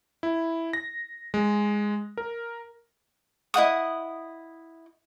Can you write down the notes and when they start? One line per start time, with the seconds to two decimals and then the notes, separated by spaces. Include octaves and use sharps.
0.23 E4
0.73 A#6
1.34 G#3
2.17 A#4
3.54 E4 D#5 F#5 D#6